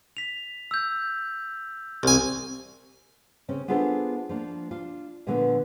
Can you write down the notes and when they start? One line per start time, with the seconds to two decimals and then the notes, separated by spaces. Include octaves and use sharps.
0.17 B6 F7
0.71 E6 G6
2.03 C2 G#5
3.48 C#3 C4 C#4
3.68 B3 D4 F4 G#4 A4 C5
4.29 F3 A#3 D4
4.71 D4 F4
5.27 A#2 D3 F3 A3 B3